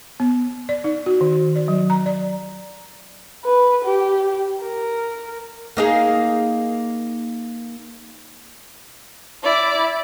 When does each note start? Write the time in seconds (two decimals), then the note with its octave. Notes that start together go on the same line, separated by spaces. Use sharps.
0.20 B3
0.69 D5
0.84 D#4
1.06 F#4
1.21 D#3
1.56 D5
1.68 F#3
1.90 A#5
2.06 D5
3.44 B4
3.84 G4
4.62 A#4
5.77 A#3 D#4 G#4
9.43 E4 D5